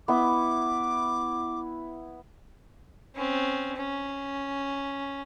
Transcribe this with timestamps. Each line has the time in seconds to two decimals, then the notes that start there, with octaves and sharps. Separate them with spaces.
0.08 B3 E4 D6
3.16 C4 C#4
3.77 C#4